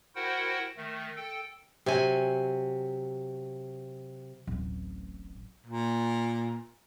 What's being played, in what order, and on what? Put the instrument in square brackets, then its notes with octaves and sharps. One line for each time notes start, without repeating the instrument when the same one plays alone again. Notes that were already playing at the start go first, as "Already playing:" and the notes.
[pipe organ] E4 F#4 A#4 C5 F#5 G5
D#3 A3
A4 G5
[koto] C3 F#3 G#5
[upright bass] D1 A1
[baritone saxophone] A#2